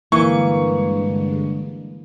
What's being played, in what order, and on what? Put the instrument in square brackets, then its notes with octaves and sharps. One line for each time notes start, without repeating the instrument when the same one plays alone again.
[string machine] G2 D3 G#3 [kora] E3 [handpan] A#3 [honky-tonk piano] C#6